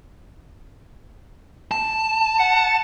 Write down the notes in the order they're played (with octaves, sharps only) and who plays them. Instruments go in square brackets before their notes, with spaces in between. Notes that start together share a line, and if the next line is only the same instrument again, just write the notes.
[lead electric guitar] A5
[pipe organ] F#5